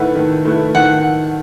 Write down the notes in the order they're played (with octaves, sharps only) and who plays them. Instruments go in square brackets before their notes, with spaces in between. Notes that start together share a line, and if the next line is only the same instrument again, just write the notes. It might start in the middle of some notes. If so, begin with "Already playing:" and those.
Already playing: [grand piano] D#3 A3 E4 B4 [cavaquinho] F#5
[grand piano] D#3
A3 E4 B4
[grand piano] D#3 [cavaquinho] F#5